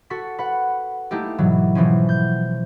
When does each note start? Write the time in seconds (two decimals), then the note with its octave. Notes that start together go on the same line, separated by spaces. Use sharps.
0.10 F#4 A4 C#6 B6
0.39 B4 F#5
1.11 A3 A#3 D#4 E4 G4
1.38 G#2 B2 E3 F#3
1.75 B2 E3 F3 C4 C#4
2.09 G6